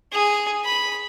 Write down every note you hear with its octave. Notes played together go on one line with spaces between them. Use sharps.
G#4
B5